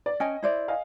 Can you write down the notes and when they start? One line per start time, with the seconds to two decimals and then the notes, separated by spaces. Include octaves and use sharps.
0.06 D5
0.20 C#4 D#5 G5 G#5
0.43 E4 C5 D5
0.68 D#5 F5 G#5